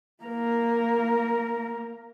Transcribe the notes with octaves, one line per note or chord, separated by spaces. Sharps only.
A#3 A#4